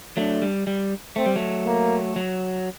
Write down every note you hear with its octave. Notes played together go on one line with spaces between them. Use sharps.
F#3 A3 D4
G3
G3
A3 C4
G3
F#3 A3
A#3
F#3